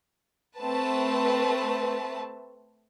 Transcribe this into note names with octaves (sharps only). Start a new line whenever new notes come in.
A3 C4 B4 A5